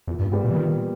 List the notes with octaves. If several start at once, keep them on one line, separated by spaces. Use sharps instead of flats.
E2 A#2
G2
G#2 G3 B3 G4
A#2
E3
A#2 D#3